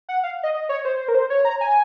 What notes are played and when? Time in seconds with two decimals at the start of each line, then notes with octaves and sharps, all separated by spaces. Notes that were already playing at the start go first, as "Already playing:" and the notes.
0.09 F#5
0.23 F5
0.43 D#5
0.54 D#5
0.69 C#5
0.85 C5
1.08 A#4
1.15 C5
1.30 C#5
1.45 A#5
1.61 G#5